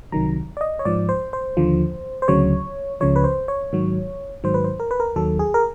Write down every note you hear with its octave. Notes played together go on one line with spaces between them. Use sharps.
C2 C3 D#3 F#3 A#5
D5
D#5
C#5
G#2 F3 D5
C5
C5
D#2 D3 F3
C5
D2 C#3 F#3 C#5
C#2 C#3 F3 C#5
B4
C5
C#5
G#2 D#3 F#3
G#2 D#3 F#3 C5
B4
C5
A#4
B4
A#4
D#2 D#3 F#3 A4
G#4
A#4